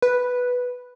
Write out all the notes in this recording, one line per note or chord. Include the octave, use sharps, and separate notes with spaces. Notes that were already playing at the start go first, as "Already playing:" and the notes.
B4